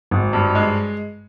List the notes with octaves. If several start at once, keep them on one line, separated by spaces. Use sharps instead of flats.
G#1
G2
G#3